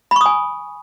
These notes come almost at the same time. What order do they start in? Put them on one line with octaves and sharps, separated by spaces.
B5 C#6 D#6 G#5